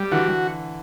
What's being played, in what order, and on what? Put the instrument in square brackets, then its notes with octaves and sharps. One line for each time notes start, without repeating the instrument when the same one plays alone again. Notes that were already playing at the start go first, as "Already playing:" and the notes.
Already playing: [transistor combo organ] G3
[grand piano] D3 E3 [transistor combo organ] F#4